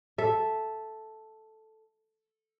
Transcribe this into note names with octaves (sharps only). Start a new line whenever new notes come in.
A4 E5